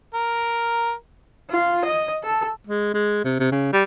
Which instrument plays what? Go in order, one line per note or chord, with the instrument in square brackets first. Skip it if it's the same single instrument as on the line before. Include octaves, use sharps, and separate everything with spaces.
[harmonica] A#4
[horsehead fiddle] F4
D#5
A4
[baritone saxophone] G#3
G#3
C3
C3
C#3
G3